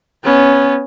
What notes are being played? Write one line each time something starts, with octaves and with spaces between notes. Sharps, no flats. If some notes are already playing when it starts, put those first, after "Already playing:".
B3 C#4